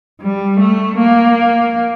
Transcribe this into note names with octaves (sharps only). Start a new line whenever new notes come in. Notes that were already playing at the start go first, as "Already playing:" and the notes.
G3
A3
A#3